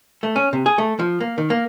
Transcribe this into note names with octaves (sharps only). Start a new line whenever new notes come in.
A3
C#4
C3
G#4
A3
F3
A#3
D#3
A#3